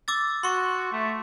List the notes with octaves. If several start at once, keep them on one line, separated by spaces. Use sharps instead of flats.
D6 E6 A6
F#4 C6 C#6
A3